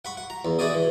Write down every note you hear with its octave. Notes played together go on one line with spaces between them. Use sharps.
F#5 B5 C#6
F#5
A#5
E2
E4 F#4 G#4 D5 D#5
E3